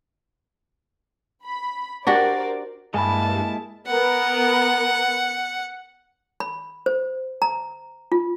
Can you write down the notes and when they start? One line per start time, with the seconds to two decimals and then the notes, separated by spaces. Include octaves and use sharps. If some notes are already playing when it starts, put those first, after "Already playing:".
1.45 B5
2.07 D4 F#4 G4 A#4 C5 D5
2.94 G2 G#3 A#3 E4 G#5 A5 B5
3.87 B3 A#4 F#5
6.40 B5
6.86 C5
7.42 A#5
8.12 F4